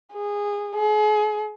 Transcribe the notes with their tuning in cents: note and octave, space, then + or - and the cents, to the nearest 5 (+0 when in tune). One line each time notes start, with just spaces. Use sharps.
G#4 -20
G#4 +35